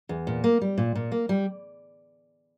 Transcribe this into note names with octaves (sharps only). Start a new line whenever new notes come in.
E2
A#2
A#3
G3
A#2
A#2
A#3
G3